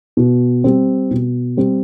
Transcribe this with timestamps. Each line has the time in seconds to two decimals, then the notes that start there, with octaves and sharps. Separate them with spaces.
0.17 B2
0.64 G3 C4
1.11 B2
1.57 G3 C4